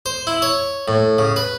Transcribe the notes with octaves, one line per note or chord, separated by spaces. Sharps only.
C5
E4
C#5
A2
C#3
B4